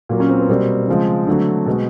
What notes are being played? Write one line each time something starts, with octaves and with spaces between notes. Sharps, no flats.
A#2 F#3 A#3
C#4
C4
B3
B2 G3 A#3 C4
C#3 F3 G#3
D3 F#3 A3
B2 G#3